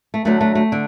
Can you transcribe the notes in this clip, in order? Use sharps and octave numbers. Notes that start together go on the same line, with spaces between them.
A3
D2 D3 F#3 A3
A3
A3
D3